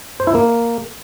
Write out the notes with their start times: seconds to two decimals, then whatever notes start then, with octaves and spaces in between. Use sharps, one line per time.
0.20 C5
0.27 E4
0.35 A#3